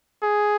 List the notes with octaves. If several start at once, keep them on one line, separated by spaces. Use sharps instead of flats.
G#4